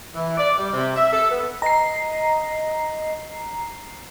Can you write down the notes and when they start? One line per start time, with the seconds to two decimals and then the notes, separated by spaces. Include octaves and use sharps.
0.15 E3
0.37 D5
0.58 G3
0.73 C3
0.96 E5
1.13 A4
1.30 B3
1.62 D#5 A#5 C7